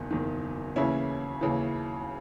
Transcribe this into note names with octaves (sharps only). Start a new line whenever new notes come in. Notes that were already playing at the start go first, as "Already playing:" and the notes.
Already playing: F#1 E2 D#3
F#1 E2 D#3
D#2 C#3 E3 C#4 E4
D#2 C#3 E3